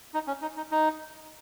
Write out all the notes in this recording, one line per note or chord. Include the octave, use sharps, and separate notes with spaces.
D#4
C#4
D#4
D#4
D#4